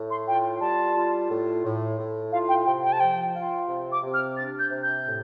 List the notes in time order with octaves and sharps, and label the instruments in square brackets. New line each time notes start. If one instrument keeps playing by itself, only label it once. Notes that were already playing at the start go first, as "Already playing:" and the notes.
Already playing: [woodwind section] A2
[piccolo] C6
[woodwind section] F4 [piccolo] G5
[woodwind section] G3 [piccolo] A5
[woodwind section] F4
A2
A2
A2
[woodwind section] F4 [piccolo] F5
[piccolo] G5
[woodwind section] C3 [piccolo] G5
[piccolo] G5
A5
[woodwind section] F3 [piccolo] G5
[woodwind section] F4
C3
[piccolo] D6
[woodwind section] C3
[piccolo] F6
[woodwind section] D4 [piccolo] A6
[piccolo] G6
[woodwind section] C3
[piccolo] G6
[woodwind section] A2